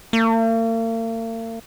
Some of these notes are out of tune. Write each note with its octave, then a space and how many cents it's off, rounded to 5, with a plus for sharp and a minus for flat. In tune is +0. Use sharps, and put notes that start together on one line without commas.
A#3 -45